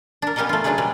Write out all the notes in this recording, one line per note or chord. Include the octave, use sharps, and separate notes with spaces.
D4 A#4
B3 C#4 G4 A#4 D5 D#5
A3 F4
C#3 F#3 G#3 D4 G#4 B4
B2 G3 G#3 B4